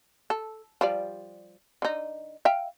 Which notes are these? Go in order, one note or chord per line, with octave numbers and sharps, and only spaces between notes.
A4
F3 G3 D5
D3 D#4
E5 F5 G5